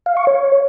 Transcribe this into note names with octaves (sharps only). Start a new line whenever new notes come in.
F5
C#6
C#5